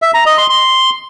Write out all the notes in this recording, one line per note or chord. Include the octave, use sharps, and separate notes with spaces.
E5
A#5
D#5
C6
C6